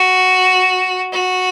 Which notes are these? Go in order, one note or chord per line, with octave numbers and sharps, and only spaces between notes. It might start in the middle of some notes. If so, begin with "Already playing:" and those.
Already playing: F#4
F#4